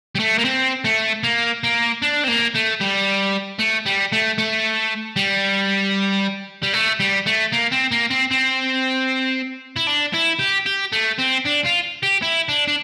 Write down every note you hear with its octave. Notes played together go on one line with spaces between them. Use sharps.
G3
A3
A#3
C4
A3
A#3
A#3
D4
C4
A#3
A3
G3
A3
G3
A3
A3
G3
G3
A3
G3
A3
A#3
C4
A#3
C4
C4
E4
D4
E4
G4
G4
A3
C4
D4
F4
G4
E4
D4
D4